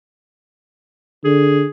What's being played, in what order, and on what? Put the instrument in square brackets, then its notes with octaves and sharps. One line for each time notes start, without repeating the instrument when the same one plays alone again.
[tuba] D3 [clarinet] G#4